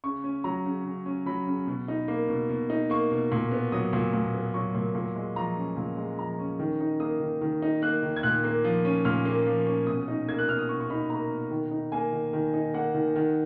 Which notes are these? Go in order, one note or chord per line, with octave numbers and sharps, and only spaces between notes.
C#3 C#6
C#4
F#3 A#5
C#3
C#3
C#4
F#3 B5
C#3
B2
D#4
A#3
B2
B2
D#4
A#3 C#6
B2
A#2
B3
F#3 D#6
A#2
A#2
B3
F#3 C#6
A#2
A#2
G#3
F3 A#5
C#4
A#2
G#3
F3 A#5
C#4
D#3
D#4
A#3 D#6
D#3
D#3
D#4
A#3 F#6
D#3
G#6
A#2 F#6
A#3
F3
C#4
A#2 F6
A#3
F3
C#4
B2 D#6
D#4
A#3 G#6
F#6
B2 F6
D#6
B2 C#6
C#6
D#4 B5
A#3 A#5
B2
D#3
D#4
A#3 G#5
D#3
D#3
D#4
A#3 F#5
D#3
D#3